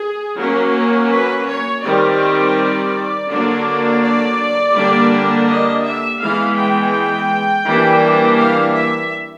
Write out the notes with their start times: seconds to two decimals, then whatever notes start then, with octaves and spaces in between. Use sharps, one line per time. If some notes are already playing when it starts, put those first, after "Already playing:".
Already playing: G#4
0.39 F#3 A#3 C#4 A#4
1.11 B4
1.48 C#5
1.84 D#3 G3 C4 D5
3.29 D3 F#3 A#3 D4
4.02 D5
4.74 D3 G3 A#3 D4
5.47 D#5
5.83 E5
6.20 E3 G#3 B3 F5
6.57 G5
7.65 E3 G3 A#3 D4
8.38 F5
8.74 E5